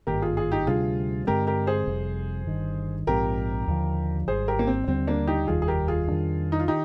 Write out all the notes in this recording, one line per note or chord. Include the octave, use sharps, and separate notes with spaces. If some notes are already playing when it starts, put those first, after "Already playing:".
G#1 G2 D#3 A#3 G4 A#4
F4 G#4
F4 G#4
D#4 G4
D2 C3 G3 D4 F4 G#4
G2 D3 G#3 C4 G4 A#4
G4 A#4
G#4 C5
F1 F2 C3 G3
G1 G2 D#3
A#1 G#2 F3 C4 G4 A#4
D#2 D3 F3
G#1 G#2 G3 G#4 C5
G4 A#4
A#3
C4
D#2 D3 G3 C4
A#3 D4
D#4 G4
F1 D#2 D#3 G3 F4 G#4
G#4
G4 A#4
F4 G#4
F2 D#3 G3 D4
D#4
F4
D#3 D#4 G4